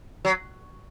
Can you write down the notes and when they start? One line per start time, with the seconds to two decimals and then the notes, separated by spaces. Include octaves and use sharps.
0.25 F#3